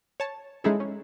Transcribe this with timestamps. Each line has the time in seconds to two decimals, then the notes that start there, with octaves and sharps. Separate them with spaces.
0.20 C#5 A5
0.64 G#3 C#4 D#4 E4 G#4 A4
0.80 C#4